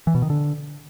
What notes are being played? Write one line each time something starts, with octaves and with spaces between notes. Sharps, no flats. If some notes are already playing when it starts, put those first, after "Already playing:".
E3
B2
D#3
D3